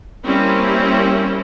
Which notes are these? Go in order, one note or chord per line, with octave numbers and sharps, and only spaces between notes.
G3 A#3 C4 C#4 E4